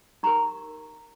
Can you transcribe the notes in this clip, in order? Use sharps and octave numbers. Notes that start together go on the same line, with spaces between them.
D#4 G4 A#4 A#5 C#6